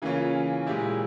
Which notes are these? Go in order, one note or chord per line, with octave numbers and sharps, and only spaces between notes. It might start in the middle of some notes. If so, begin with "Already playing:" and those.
C#3 E3 A#3 C#4 F4
A#2 G#3 E4 G4